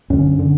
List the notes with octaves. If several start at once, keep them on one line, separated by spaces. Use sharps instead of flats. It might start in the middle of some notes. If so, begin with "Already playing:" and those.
F#2 D3 C#4
D3